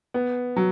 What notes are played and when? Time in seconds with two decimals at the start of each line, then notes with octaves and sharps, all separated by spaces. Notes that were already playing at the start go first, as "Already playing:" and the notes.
0.14 B3
0.56 F#3